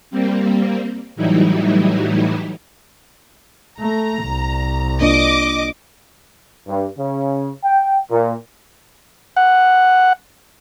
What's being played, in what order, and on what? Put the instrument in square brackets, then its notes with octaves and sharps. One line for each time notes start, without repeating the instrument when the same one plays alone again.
[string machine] G3 A#3 C4
A2 E3 F#3 G3 D#4 E4
[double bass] A3 [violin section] A#5
[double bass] C2
[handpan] A#3 D4 F4 [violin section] D#5 D6
[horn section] G2
C#3
G5
A#2
[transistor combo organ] F#5